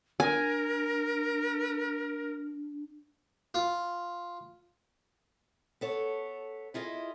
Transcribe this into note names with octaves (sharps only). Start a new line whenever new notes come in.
D4 A#4 G#5
F4
B3 A4 C#5
E4 F4 G#4 D#5